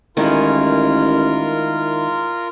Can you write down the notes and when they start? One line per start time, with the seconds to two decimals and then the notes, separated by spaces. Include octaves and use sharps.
0.17 A1 D#3 G#3 E4 F4 A#4